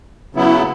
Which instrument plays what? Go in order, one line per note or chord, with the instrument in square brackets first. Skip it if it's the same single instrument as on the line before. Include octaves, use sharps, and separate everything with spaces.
[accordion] C#3 F#3 B3 E4